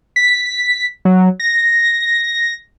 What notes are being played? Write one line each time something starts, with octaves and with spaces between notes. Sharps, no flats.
B6
F#3
A#6